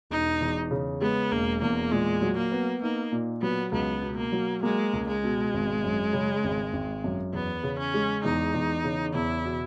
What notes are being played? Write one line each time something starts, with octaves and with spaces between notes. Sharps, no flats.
E1 D#4
E2
C#3
G#3 B3
E1 A#3
E2 A#3
A#2 G#3
F#3
A#3
B3
A#3 D#4
A#2
F#3 B3
C#2 B3
B2
A#3
F#3
G#3 A#3
C#2
G#3
B2
G#1
F#2
C#3
G#1
G#1
F#2
E2 B3
C#3
C#4
G#3
E2 D#4
E2
C#3
E2 E4
B2